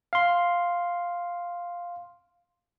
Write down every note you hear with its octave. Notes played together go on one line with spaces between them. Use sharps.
F5 C6